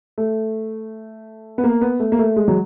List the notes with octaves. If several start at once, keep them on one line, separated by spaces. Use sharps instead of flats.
A3
B3
A#3
B3
A3
A#3
A3
G#3
F#3